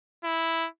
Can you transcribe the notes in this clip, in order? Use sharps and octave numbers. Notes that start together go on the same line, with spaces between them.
E4